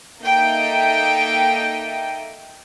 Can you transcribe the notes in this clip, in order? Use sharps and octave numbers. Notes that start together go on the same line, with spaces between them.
A#3 D#4 A4 D#5 E5 G5